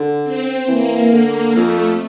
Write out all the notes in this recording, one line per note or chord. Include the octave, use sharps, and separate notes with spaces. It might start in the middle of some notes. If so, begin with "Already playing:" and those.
Already playing: D3
C4
E3 A#3
D3 A#3
F2 A3